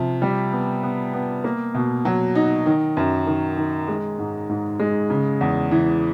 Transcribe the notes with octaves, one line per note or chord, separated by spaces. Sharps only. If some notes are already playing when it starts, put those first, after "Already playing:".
Already playing: C3 F3
G3
B3
B3
B3
A#3
B2
F#3
D#4
D#3
F#2
D#3
D#3
G#3
G#2
G#2
G#3
C#3
E2
E3